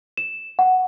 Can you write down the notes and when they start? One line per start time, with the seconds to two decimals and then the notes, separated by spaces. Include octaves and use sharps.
0.17 E7
0.59 F#5